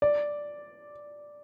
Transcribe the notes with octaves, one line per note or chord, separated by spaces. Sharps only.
D5